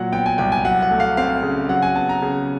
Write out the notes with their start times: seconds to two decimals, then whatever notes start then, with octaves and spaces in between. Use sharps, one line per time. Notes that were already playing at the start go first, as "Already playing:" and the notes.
Already playing: A#2 F#3 F#5
0.12 B3 G5
0.26 G#5
0.38 C2 G5
0.52 G#5
0.65 F#3 F#5
0.82 F#5
0.91 A3
1.00 F5
1.17 C4 F5
1.43 C#3
1.69 F#3 F#5
1.82 G#5
1.95 B3 A5
2.09 A#5
2.22 C#3